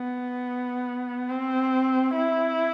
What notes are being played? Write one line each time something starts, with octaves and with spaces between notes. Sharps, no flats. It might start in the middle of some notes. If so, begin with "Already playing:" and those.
Already playing: B3
C4
E4